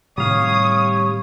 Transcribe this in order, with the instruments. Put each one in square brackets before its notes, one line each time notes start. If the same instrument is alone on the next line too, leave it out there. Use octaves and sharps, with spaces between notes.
[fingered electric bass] A2 C3 D#3 [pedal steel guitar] G3 F5 [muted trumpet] C#5 [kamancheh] D#6